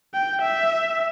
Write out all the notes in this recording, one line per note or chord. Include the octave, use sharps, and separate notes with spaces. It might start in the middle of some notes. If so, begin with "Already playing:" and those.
G5
E5